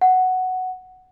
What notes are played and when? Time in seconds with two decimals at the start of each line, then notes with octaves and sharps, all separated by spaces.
0.02 F#5